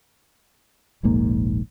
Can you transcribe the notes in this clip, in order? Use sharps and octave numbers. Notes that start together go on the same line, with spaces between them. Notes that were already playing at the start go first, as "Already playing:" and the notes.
D#1 A#1 G#2 A#3